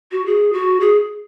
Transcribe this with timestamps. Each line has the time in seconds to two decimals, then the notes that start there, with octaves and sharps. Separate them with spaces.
0.12 F#4
0.26 G#4
0.53 F#4
0.80 G#4